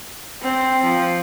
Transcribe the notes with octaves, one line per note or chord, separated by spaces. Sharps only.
C4
F3